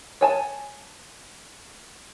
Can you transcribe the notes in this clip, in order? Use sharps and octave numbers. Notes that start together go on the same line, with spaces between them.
C#5 G#5 A5